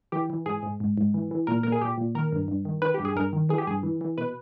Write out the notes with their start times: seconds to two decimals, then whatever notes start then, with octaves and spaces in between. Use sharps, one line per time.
0.12 E3 G4
0.30 E3
0.46 G#2 G#4
0.63 G#2
0.80 G#2
0.98 G#2
1.14 E3
1.31 E3
1.47 A#2 A#4
1.63 A#2 A#4
1.72 G#4
1.81 A#2 G4
1.98 A#2
2.15 D#3 A#4
2.32 G2
2.48 G2
2.65 D#3
2.82 D#3 B4
2.94 G2 G4
3.05 G#4
3.16 G2 A#4
3.33 D#3
3.49 E3 G#4
3.58 G4
3.67 G2 G#4
3.83 E3
4.01 E3
4.18 B2 B4